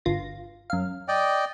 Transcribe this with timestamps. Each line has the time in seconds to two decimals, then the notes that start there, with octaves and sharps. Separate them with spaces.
0.05 G1 F4 A#6
0.70 F#2 F5
1.08 D5 D#5 G5